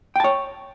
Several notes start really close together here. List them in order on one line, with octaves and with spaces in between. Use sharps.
G5 A5 C#5